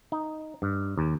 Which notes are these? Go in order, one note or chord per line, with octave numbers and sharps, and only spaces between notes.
D#4
G2
D#2